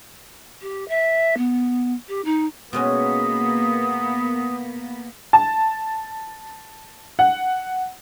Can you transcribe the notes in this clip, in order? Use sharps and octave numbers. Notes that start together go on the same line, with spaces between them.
G4
E5
B3
G4
D#4
B2 G#3 A#3 B3 C#4 D#6
A5
F#5